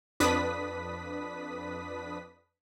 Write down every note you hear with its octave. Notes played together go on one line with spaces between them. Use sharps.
F2 D4 B4 D#6 B6